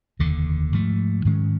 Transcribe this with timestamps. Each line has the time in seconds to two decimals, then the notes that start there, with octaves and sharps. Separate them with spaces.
0.19 F1 D#2 D3
0.72 G#2 F3 A3
1.25 G#2 D#3 G#3 C#4